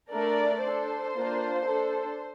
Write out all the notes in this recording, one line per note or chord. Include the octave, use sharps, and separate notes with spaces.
A3 D4 A4 A#4 D5
D4 A4 C5
A#3 D4 F4
D4 A4